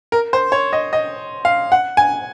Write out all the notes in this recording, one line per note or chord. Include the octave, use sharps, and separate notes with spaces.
A#4
C5
C#5
D#5
D#5
F5
F#5
G#5